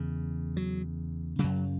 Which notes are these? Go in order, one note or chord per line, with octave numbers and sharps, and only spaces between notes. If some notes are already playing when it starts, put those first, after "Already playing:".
Already playing: E2 C#3
F#3
F#2 C#3 F#3